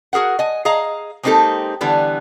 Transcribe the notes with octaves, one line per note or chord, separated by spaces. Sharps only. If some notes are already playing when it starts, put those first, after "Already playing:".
F#4 G#4 A#4 F#5
D#5 G#5
G#4 D#5 F5 A#5
G#3 A#3 C4 D#4 G4 A4
D3 E3 G3 B3